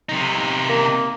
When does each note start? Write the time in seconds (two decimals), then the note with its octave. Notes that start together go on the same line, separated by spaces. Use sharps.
0.09 C3 D#4
0.69 A#3